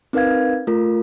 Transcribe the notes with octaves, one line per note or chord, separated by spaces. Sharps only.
C4 D#4 A#4 B4 F5 G#6
A3 F4 A#4